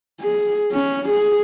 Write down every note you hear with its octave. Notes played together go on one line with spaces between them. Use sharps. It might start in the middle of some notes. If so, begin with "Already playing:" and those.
G#4
C#4
G#4